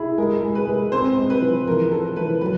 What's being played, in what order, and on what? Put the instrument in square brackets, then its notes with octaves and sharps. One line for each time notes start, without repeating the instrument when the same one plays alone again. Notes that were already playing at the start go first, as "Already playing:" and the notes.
Already playing: [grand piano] E4 [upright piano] G#4
[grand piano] G#3 [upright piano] A#4
[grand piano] G#3
[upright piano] B4
[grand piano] G#3
[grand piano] C4 [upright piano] C5
[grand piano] G#3
[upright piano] B4
[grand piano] F3
[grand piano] E3 [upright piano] A#4
[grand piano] C#4 [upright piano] A4
[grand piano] E3 [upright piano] B4
[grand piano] F#3 [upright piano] B4